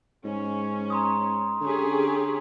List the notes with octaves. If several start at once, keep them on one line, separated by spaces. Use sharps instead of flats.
G#2 C#4
A#5 C6 D#6
D3 C#4 G4 G#4